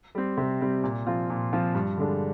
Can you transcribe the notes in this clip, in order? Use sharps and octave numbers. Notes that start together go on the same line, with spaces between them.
G3 C4
C3
G3 C4
A#2
F3 C4 F4
A#2
F3 C4 F4
G2
D3 G#3 D4